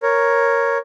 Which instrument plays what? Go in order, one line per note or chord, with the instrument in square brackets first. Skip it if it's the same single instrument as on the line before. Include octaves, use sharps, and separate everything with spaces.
[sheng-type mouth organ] A#4 C#5